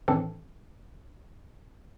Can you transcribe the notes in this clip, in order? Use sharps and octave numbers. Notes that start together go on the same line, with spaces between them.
A2 D#3 E3 C4 D4 A4